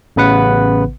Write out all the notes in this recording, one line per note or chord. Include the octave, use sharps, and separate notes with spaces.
A1 C#3 B3 B4 F#5